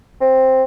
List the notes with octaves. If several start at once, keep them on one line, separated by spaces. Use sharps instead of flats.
C4